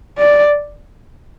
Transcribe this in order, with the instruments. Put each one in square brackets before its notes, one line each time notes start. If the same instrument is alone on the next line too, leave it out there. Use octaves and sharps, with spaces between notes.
[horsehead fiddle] D5